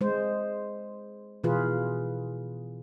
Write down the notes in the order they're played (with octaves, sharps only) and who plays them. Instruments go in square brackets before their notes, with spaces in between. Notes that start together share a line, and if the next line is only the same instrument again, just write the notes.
[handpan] G#3 C5
B2 E3 F4 G#4 B4